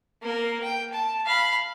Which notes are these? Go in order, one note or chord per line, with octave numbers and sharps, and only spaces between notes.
A#3 A#4
G5
A5
F5 B5